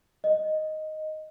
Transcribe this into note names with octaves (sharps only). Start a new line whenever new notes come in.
D#5